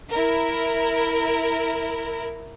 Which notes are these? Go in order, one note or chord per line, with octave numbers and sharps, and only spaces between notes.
E4 A#4